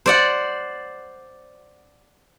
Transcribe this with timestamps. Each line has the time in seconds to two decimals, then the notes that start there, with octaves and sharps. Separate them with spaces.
0.06 C5 D5 F#5